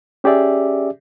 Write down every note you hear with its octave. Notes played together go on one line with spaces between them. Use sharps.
C#4 G4 G#4 D5 E5